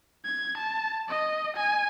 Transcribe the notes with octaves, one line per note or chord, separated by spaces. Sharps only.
G#6
A5
D#5
G#5